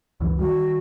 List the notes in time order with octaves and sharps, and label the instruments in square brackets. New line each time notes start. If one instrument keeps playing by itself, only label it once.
[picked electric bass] C#2 F#2 E3
[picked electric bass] D#3 G3 [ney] F#4